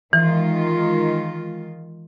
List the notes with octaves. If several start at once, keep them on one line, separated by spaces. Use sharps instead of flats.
D#3 E3 G#3 F4